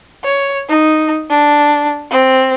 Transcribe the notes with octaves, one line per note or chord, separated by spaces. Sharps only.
C#5
D#4
D4
C4